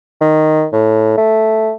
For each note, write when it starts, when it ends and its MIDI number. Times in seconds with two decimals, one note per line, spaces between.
0.21 0.66 51
0.73 1.15 45
1.18 1.72 57